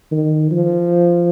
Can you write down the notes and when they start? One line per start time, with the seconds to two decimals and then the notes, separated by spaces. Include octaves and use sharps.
0.12 D#3
0.51 F3